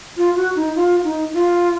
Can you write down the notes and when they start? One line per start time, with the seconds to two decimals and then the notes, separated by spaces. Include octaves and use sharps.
0.17 F4
0.36 F#4
0.56 D#4
0.76 F4
1.04 D#4
1.34 F4